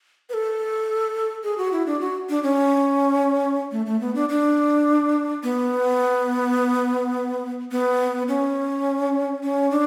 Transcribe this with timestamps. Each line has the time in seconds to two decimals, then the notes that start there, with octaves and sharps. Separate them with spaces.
0.29 B4
0.34 A4
1.44 G#4
1.58 F#4
1.72 E4
1.86 D4
2.01 F#4
2.29 D4
2.43 C#4
3.72 A3
3.86 A3
4.01 B3
4.15 D4
4.29 D4
5.43 B3
7.71 B3
8.28 C#4
9.43 C#4
9.71 D4